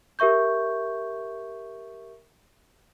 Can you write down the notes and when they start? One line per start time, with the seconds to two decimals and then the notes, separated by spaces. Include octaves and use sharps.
0.19 G4 A#4 E5 C#6 G6